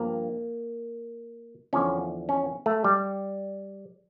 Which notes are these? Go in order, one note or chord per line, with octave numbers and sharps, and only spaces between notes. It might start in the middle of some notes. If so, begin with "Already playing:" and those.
Already playing: G2 F3 A#3
E2 D3 F3 C#4
C#4
A3
G3